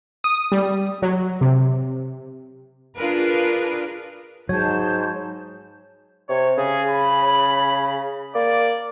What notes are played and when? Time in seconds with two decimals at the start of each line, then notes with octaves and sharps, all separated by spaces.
0.24 D#6
0.52 G3
1.02 F#3
1.41 C3
2.96 D4 F4 G#4 A#4 B4
4.49 G#2 F#3 C#5 A5 G6
6.29 C3 C#5
6.58 C#3 G#4
6.88 B5
8.35 A#3 D5